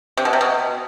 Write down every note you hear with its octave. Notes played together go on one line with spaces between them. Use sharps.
C3
B2
C3
B2